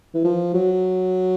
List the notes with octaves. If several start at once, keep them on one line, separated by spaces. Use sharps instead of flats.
E3
F3
F#3